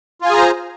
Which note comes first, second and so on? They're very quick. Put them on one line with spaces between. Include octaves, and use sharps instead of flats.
F4 G#5 G#4 A#5 C5